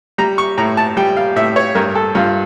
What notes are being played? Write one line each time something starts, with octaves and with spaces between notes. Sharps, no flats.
G3 A#5
C#6
A2 A#5
A5
G3 G5
F5
A2 E5
C#5
G2 A#4
A4
G2 F4